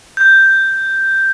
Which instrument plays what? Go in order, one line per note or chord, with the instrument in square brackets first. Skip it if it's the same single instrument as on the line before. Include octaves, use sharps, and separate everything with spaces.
[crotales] G6